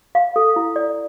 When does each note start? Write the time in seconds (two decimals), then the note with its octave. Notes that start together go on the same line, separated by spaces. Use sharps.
0.15 F5
0.36 A4
0.56 E4
0.76 D5